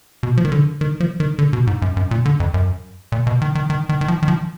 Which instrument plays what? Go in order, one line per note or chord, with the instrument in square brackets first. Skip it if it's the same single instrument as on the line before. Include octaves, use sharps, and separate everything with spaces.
[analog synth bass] B2
F3
D#3
D3
D#3
F3
D#3
D3
B2
G#2
F#2
F#2
A#2
D3
F2
F#2
A#2
B2
D#3
D#3
D#3
D#3
D#3
F3
D#3
F3